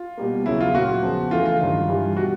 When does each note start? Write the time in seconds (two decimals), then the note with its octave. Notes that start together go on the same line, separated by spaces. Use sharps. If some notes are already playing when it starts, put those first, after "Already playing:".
Already playing: F4
0.17 B2 G3 A#3
0.46 E2 C#3 F#3 E4
0.60 F4
0.74 A#2 F#3 A#3 F#4
1.03 E2 C#3 F3
1.31 C#3 E3 A3 F4
1.45 F4
1.60 G2 D#3 F#3
1.88 G2 E3 G3
2.16 B2 G3 B3 F#4